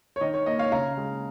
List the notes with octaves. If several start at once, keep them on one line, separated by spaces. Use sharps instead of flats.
C#5
D#3 D#5
C#5
A#3 D#5
C#5 F5
C#3 F5 A#5
G#3